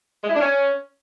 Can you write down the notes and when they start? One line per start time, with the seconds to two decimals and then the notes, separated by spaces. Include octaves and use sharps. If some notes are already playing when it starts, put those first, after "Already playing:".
0.24 G#3
0.29 E4
0.35 D4
0.41 C#4